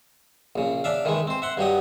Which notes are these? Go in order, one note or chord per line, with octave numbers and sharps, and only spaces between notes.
A#1 C#3
D4 D5 E5 F5
D#3 E3 G#3
C4 C5
E5 F#5 C6
G2 F#3 G4 D#5